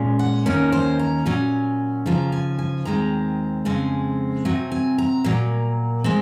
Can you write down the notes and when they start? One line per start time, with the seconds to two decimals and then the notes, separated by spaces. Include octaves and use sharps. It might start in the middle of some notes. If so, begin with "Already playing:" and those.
Already playing: A#2 G#3 C#4
0.19 F#5
0.46 D#2 D#3 A#3 C#4 A#4
0.72 C5
0.99 A#5
1.26 A#2 F#3 C#4 G#5
2.06 D#2 C#3 F3 A#5
2.32 G#5
2.59 G#5
2.85 D#2 D#3 G#3 C4 A#5
3.65 F2 C#3 G#3 C4 G#5
4.45 C3 F#3 C4 G#5
4.72 G#5
4.98 A#5
5.24 A#2 F#3 A#3
6.04 G#3 C4